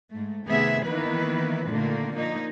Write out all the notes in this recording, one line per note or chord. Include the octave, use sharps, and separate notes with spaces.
G#2 A3
C3 D#3 A3 B3 G#4 E5
D#3 E3 A#3 B3 E4 B4
A#2 D3 D#3 A3 A#3
A#2 F3 A#3 D#4